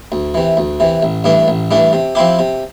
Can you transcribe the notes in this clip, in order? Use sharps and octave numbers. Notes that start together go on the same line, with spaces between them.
D2
C3 E3
D2
C3 E3
A1
G2 E3 A3 D4
A1
G2 E3 A3 D4
C3
F3 C4 E4 G4
C3